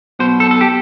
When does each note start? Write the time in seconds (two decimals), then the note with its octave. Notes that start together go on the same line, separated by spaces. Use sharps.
0.19 B1 B2 C5
0.40 A4
0.51 A4
0.61 G4